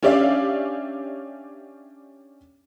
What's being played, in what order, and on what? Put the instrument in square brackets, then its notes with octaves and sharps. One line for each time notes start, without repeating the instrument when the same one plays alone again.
[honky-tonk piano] C#4 D4 G4 D5 E5 F5